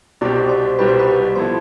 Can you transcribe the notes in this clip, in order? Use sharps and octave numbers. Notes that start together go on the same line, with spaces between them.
C2 B2 G3 C4 G4 D5
C5
C2 B2 G3 C4 G4 B4
C5
B4
F3 B3 E4 A4 C5